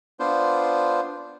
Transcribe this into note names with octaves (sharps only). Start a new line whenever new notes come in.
B3 D4 F4 C5